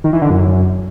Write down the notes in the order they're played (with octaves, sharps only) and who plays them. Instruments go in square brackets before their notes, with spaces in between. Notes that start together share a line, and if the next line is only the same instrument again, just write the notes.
[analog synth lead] D#3
E3
D3
F#2